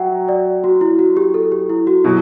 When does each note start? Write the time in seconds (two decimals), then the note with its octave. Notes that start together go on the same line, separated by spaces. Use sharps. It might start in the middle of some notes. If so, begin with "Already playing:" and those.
Already playing: F#3 E5 F#5 G5
0.28 D5
0.64 F#4
0.81 E4
0.99 F#4
1.17 G4
1.34 A4
1.52 G4
1.70 E4
1.87 F#4
2.04 B2 F#3 E4